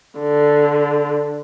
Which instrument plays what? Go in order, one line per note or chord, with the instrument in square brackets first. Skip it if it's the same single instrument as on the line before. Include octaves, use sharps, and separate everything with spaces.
[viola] D3